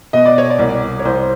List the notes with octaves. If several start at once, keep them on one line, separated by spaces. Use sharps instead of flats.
B2 D#5
D5
C#5
D5
C2
C#5
C2 C5